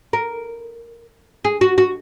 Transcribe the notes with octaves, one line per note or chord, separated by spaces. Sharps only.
A#4
G#4
F#4
F#4